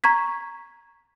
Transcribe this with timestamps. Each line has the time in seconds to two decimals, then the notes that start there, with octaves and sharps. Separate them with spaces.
0.04 A#5 C#6 G#6 B6